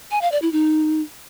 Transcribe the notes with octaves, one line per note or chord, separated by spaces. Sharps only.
G#5
F5
D5
E4
D#4